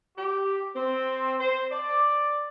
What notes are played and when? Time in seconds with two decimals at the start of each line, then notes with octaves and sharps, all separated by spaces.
0.17 G4
0.75 C4
1.38 C5
1.71 D5